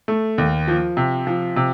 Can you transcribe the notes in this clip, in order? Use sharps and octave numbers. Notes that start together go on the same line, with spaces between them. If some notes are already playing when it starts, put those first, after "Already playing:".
A3
D#2
F3
C3
F3
C3